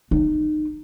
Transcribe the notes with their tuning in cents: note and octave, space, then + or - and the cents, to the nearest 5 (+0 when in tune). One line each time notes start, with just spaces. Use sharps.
D#4 -30